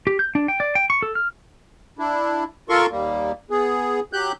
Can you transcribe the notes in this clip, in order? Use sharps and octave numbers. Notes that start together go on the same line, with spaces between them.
G4
G6
D4
G5
D5
G5
C#6
A4
F6
D4 E4
F4 A4 A#4 C6 C#6
D#2 G3 A#3
B3 G#4
F#3 G4 F#6 G6